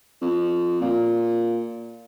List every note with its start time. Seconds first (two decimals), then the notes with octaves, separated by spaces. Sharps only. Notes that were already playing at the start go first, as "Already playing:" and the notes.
0.22 F2
0.81 A#2